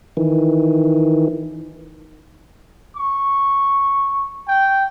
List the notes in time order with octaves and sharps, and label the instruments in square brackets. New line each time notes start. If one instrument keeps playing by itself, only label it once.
[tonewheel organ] D#3 E3
[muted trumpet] C#6
G5